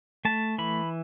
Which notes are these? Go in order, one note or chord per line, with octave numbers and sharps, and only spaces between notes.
A3 A5
E3 B5